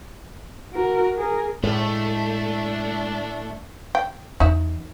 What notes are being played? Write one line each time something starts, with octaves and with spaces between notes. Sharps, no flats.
F#4 A#4
G#4 A#4
A2 G#3 A3 D4
G5
E2 D#4 E5